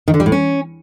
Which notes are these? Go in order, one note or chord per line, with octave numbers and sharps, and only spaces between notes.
D#3
D3
G3
A2
C#4